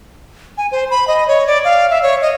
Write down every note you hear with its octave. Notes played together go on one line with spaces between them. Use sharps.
G#5
C5
B5
D#5
C#5
D5
F5
E5
C#5
D#5